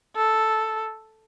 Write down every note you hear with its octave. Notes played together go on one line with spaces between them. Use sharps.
A4